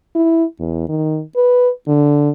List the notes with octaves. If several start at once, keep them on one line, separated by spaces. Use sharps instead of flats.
E4
E2
D#3
B4
D3